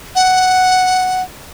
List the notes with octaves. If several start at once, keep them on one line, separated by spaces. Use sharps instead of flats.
F#5